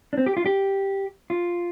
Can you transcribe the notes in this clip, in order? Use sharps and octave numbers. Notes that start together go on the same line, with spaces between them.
D4
C4
G4
F4
G4
F4